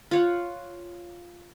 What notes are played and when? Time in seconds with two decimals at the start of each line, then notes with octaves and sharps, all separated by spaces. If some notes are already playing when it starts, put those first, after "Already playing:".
0.11 F4 C#5 F#5